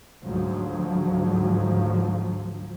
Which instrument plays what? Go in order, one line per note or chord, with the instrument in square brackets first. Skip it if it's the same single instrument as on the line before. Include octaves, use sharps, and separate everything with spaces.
[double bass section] D2 G#2 F3 F#3